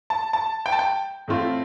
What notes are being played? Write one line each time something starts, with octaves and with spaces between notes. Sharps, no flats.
A5
A5
G5
A5
G5
A2 A3 C4 F4